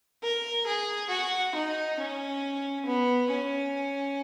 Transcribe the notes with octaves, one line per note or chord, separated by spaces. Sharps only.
A#4
G#4
F#4
D#4
C#4
B3
C#4